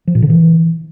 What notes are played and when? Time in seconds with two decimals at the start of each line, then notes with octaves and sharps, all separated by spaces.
0.07 F3
0.15 A#2
0.22 D3
0.30 E3